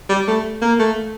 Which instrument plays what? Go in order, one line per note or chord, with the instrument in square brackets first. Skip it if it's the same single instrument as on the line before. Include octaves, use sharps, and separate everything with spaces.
[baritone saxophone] G3
A3
A#3
A3